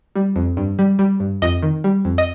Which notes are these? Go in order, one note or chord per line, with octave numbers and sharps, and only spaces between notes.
G3
F2
G2
G3
G3
G2
F2 D#5
D#3
G3
F2
D#5